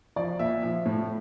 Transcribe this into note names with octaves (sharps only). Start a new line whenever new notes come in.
F3 D5
A#2 E5
F3
A2